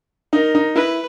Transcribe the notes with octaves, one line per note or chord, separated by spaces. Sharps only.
D#4 A#4
D#4
E4 B4